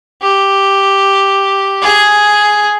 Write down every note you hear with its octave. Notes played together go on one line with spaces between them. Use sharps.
G4
G#4